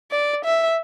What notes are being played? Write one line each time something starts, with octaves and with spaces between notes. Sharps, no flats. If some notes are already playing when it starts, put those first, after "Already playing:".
D5
E5